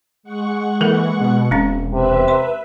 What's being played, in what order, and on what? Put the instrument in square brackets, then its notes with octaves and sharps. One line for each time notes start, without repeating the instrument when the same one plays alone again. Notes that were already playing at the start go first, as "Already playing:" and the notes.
[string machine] G#3 F#5 C#6
[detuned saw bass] E3 [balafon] A#3 A4 A#4
[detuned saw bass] B2
[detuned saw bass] E1 [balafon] G#3 C4 C#4
[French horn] C3 [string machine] B4 E5
[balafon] C6